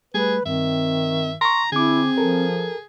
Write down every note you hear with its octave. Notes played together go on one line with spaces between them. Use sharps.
G3 A3 G#4 B4
G2 D#3 C4 E5
A#5 C6 C#6
D3 C4 E4 G#4 D6
F3 A4 A#4